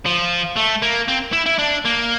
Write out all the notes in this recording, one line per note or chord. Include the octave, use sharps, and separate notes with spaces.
F3
A3
A#3
C4
E4
E4
D4
A#3